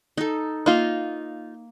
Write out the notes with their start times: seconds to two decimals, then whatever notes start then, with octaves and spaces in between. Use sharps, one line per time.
0.17 D#4 A4
0.66 A#3 D#4 F4 D#5